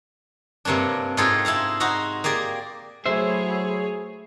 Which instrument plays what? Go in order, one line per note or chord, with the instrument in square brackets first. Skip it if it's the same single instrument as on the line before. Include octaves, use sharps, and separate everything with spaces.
[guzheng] G2 C3 A#3 C#4 D4
G#2 G#3 F4 G#4 A4 G5
E4 C5 F5 A#5
D#4 F#4 C5 A#5
A#3 G4 G#4 D5
[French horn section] F#3 [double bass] A3 E4 [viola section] G#4 C#5 [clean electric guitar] C5 E5